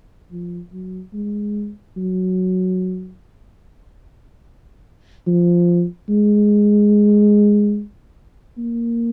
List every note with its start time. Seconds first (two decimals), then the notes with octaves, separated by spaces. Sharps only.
0.32 F3
0.73 F#3
1.14 G#3
1.97 F#3
5.27 F3
6.09 G#3
8.58 A#3